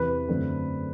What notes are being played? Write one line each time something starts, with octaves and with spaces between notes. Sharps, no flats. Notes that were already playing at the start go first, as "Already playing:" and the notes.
Already playing: E2 C3 E3 B4
F#2 D3 A3 C4